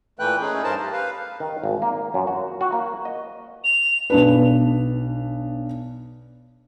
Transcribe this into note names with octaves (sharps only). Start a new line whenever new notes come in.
A#2 E3 A3 B4 G5 F#6
A3 C#4 D#4 G#4
G2 A#4 C5 A5
G4
B4 F5
D#3
G#1
A#3
F#2
F#4
F#4
A#3
D#5
F7
B1 D4 B4